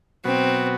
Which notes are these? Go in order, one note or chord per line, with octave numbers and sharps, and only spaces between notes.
B2 F#3 B3 C4 F#4